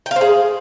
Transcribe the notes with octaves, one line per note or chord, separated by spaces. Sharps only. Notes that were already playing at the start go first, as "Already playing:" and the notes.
G5
F5
C5
G#4